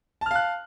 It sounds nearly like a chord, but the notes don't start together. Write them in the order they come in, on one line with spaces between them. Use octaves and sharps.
A5 F6 F5 F#6